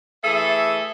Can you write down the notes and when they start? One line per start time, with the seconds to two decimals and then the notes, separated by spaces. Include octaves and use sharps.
0.24 E3 A3 G#4 A4 E5